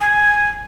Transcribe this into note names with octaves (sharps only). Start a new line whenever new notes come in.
G#5